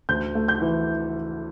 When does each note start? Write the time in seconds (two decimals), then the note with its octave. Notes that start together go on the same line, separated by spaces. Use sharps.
0.09 D2 G6
0.35 A3
0.48 G6
0.62 E3